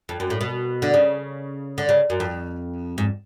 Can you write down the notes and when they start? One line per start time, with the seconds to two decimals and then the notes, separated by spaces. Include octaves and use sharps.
0.09 F2
0.20 F#2
0.30 A2
0.41 B2
0.82 D3
0.94 C#3
1.78 D3
1.89 C#3
2.10 F#2
2.20 F2
2.98 G#2